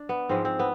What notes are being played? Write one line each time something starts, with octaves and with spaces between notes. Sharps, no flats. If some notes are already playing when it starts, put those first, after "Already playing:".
Already playing: D4
B3
G#2 F3 G#3 C4
C4
B3